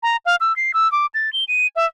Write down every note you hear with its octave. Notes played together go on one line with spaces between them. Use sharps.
A#5
F5
E6
C7
E6
D6
A6
G7
D#7
E5